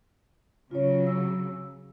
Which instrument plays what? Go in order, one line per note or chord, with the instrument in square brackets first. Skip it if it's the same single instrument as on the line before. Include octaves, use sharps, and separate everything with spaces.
[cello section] C#3 F#3 [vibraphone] F4 C#5
[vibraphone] E6